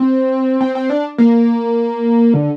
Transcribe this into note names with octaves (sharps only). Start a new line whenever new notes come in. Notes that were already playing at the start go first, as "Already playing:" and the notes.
Already playing: C4
C4
C4
D4
A#3
D3